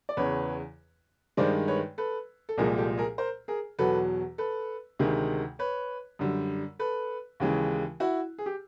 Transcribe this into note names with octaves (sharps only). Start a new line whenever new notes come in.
D5
E2 C#3 E3 B4 C#5
G2 D#3 G#3 C5 D5
B4 C#5
A4 B4
A4
C2 A#2 F3 G#3 G#4 A#4
G4 A4
G#4 A#4
A#4 C5
G#4 A#4
E2 B2 F#3 A4 B4
A4 B4
D2 C3 D#3 G#3
B4 C#5
F#2 D3 G3
A4 B4
D#2 C#3 E3 G#3
E4 F#4
G#4
G4